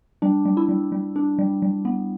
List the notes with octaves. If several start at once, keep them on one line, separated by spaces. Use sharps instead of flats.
G3 D4
G3
E4
G3
G3
D4
G3
G3
B3